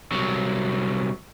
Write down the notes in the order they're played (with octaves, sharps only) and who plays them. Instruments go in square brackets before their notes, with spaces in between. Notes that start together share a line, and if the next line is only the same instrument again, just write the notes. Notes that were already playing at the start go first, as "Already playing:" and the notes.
[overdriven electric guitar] C2 F#3